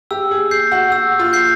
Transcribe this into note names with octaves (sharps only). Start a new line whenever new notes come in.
G4 E6
G#4
G6 C7
F#4
F#4 E6
F4
G6 C7